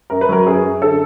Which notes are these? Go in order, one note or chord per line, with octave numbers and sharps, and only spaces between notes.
F#2 A#4
B4
F#3 A#4
F#2 G#4
F#2
D3 A4